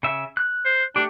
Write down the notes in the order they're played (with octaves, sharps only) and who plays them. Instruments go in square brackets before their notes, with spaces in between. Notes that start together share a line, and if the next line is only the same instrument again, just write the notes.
[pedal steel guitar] C#3 E5
F#6
[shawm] C5
[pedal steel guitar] A3 G4 [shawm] D4